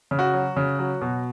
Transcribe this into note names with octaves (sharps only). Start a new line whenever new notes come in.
C#3
F#4
F#3
C#3
F#3
B2